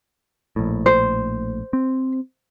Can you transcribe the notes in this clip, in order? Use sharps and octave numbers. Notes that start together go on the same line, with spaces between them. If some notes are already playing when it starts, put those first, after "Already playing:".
A#1 A2
C5
C4